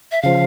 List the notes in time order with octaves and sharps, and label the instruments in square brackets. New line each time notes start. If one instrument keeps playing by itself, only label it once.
[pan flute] E5
[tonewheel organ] C#3 F3 [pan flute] F5